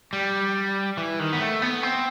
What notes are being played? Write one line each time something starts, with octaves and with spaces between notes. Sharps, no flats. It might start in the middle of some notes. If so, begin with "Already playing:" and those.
G3
E3
D#3
B3
A3
B3
C4